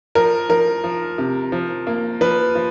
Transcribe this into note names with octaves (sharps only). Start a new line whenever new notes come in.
F3 A#4
F3 A#4
F3
C3
F3
A#3
F3 B4
F3